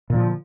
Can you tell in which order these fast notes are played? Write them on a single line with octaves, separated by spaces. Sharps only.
A#2 D3 F3